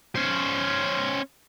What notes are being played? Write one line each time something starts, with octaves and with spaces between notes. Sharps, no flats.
C#4 C5